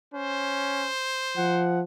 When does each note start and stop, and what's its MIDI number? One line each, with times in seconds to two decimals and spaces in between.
0.14 0.88 61
0.14 1.68 72
1.37 1.83 53
1.37 1.81 78